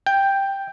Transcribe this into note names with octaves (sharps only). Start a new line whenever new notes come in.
G5